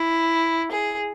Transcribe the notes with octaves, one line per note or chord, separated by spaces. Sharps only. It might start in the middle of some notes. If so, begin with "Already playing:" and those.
Already playing: E4
G#4